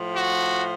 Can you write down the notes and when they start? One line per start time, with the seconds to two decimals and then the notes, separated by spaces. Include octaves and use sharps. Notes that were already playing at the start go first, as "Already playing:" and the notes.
Already playing: A2 F3
0.16 F#4